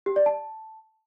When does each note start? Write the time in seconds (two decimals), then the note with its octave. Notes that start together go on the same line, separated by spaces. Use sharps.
0.06 G4
0.16 D5
0.26 A5